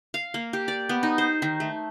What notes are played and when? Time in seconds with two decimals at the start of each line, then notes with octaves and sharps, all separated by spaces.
0.14 F5
0.34 A#3
0.53 G4
0.68 D5
0.89 B3
1.03 D#4
1.18 C5
1.42 D#3
1.60 A3